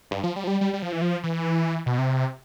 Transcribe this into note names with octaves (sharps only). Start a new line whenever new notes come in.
G2
F3
G3
F3
G3
G3
G3
F3
E3
F3
E3
B2
C3